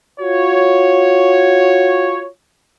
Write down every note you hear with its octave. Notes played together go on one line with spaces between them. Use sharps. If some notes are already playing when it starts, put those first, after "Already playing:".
F4 F#4 C#5